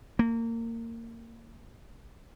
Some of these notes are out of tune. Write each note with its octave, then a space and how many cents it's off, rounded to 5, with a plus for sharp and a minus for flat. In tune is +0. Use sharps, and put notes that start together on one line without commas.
A#3 -25